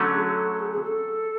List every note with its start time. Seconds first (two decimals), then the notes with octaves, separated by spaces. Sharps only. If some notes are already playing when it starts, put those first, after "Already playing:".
Already playing: D3 F#3 A3 C#4
0.14 G#4
0.21 A4
0.52 A4
0.59 G#4
0.73 G#4
0.83 A4